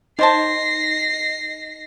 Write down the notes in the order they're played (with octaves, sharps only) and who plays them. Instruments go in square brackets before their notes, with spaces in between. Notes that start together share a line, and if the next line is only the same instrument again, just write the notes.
[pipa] D#3 C5 A5 [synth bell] D#4 D#5 [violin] A#6 C7